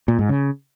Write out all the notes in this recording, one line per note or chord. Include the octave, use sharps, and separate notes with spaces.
A#2
G#2
C#3